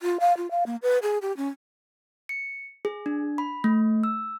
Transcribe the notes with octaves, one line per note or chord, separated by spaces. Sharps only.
F4
F5
F4
F5
A#3
B4
G#4
G4
C#4
C#7
G#4
D4
B5
A3
E6